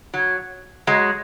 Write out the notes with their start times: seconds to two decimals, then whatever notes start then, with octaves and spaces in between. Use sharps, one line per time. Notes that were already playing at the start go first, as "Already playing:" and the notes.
0.14 F#3
0.87 F#3 G#3